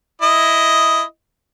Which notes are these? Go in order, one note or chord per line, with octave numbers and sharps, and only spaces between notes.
E4 D#5